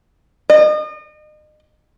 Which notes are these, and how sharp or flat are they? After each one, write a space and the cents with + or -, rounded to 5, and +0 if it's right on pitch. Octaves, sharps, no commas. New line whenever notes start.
D#5 -35